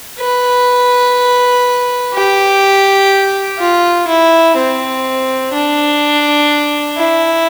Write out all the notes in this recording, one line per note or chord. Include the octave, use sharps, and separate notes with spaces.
B4
G4
F4
E4
C4
D4
E4